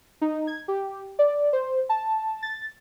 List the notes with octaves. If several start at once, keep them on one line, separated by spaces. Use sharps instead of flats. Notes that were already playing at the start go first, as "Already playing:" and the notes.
D#4
G#6
G4
D5
C5
A5
A6